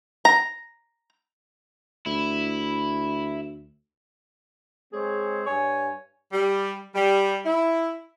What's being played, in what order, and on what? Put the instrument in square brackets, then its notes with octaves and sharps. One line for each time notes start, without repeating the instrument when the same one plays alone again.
[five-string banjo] A#5
[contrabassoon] D2 [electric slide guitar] E4
[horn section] G#3 C4 G#4 C#5
G2 C#5 G#5
G3
G3
E4